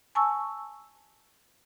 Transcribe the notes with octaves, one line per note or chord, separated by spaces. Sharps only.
G#5 A5 C#6 E6